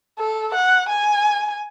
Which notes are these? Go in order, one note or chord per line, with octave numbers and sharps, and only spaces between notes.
A4
F#5
G#5